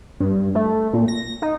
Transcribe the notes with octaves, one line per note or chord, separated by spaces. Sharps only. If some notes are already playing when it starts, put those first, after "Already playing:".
G2
A3
A#2
A#6
D#4